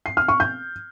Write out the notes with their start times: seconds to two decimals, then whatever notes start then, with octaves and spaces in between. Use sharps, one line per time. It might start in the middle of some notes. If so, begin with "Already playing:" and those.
0.06 C7
0.17 F6
0.28 C#6
0.40 G6